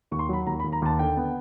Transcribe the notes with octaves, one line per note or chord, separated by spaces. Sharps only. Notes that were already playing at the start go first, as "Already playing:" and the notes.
D#2 C#6
C6
F#3 B5
D#2 A#5
B5
D#2
A#5
D#2 A5
D3 G5
B3